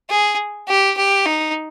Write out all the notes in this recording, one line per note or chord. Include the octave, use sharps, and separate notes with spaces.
G#4
G4
G4
D#4